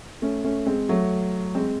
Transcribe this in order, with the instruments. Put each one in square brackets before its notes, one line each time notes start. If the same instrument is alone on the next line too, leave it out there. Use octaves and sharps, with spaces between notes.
[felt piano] A3 C#4
A3 C#4
G#3 C4
F#3 A3
G#3 C4